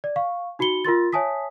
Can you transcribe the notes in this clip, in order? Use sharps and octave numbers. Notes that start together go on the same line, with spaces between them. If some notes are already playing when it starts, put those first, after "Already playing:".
D5
F5 C#6
D#4 F#4 B5 C#7 G7
F4 A#4 C6 A6
C#5 E5 G#5 A5 D#6 B6